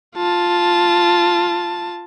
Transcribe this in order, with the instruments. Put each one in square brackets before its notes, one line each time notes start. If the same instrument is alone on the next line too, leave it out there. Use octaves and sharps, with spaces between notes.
[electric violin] F4 A5